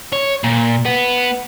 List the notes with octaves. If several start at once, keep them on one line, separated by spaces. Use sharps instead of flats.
C#5
A#2
B3